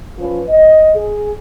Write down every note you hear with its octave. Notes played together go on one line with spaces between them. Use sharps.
F3 C#4 F4 B4
D#5
G#4